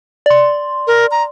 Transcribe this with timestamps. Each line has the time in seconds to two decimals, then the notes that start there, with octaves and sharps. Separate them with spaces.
0.26 D5 C6
0.87 A#4
1.11 A#5